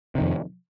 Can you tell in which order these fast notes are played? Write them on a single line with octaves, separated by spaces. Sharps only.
C3 D#3 F2